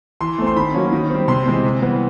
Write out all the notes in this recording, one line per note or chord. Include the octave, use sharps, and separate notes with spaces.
E3 C6
A3 C4
C6
D#3 B5
F#3 A#3 C#4
D#3
G3 C4
C3 C6
E3 G#3 C4
C3
E3 G3 B3